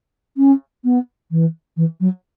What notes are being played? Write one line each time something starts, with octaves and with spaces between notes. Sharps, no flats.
C#4
B3
E3
E3
F#3